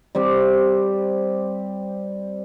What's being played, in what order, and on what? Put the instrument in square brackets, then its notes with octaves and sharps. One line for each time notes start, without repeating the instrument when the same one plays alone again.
[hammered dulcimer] G3 C4 G4